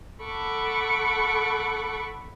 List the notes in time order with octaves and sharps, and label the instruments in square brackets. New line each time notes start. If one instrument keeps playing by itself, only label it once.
[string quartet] A4 F#5 B5 C#6 D6